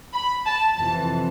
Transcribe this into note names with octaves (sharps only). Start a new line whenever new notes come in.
B5
A5
F2 C3 E3 A5